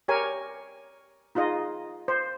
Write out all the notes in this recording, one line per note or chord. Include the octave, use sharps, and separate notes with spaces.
G4 A#4 C#5 G#5
D#4 F4 G#4 D#5
C5